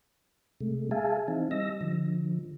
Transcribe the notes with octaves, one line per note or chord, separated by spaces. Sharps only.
C3 G#3 A3
G#4 E5 F5 G#5 A5
E3 C4 D#4
G3 D#5 E6 A#6
D3 F3